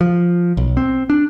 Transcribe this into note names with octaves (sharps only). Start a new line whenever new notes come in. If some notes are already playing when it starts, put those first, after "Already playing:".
F3
B1
C4
D4